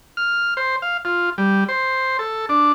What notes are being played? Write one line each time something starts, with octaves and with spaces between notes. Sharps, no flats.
F6
C5
F5
F4
G3
C5
A4
D4